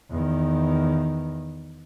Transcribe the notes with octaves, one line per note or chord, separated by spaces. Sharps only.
E2 D#3